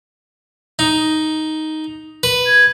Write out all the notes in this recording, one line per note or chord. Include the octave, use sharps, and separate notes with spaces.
D#4
B4
G#6